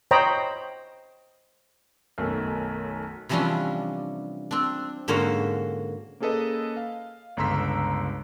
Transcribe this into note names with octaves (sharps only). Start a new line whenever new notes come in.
C5 C#5 D#5 G5 A#5 B5
B1 F#2 D#3 A3 D#4 E6
C3 E3 F3 G3 C#4 D4
C4 D4
G#2 D3 A#3 C#4 F#4 C5
A#3 C#4 G#4 A4 B4 D#5
F5
G1 C#2 A#5 C6 E6 B6